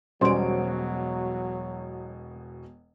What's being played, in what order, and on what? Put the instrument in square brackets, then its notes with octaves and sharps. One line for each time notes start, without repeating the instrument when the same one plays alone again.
[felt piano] E1 B2 D7 [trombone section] F#3 [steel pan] G3 C#4 [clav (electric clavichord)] C5